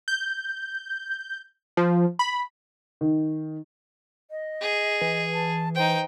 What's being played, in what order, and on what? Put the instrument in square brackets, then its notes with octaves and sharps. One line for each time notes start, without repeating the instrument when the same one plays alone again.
[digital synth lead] G6
F3
B5
[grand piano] D#3
[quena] D#5
[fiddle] G#4
[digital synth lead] E3
[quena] A5
[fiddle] D#4 G5 [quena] C5